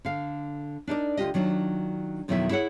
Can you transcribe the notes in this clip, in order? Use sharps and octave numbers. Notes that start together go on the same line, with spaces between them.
D3 F5
D4 D#4 A#4 D5
D2 F4 G4 D#5
D#3 F#3 D4 F4
F2 B2 D#3 F#3 E4 E5
E4 G#4 C#5 F#5